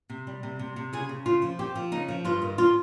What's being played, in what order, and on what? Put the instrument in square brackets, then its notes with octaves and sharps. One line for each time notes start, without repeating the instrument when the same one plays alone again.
[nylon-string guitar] C3
G3
C3
C3
C3
C#3 G#4
C#3
C#3 F4
F3
C4 G4
F3
C#3 D#4
F3
G2 F4
D#3
F4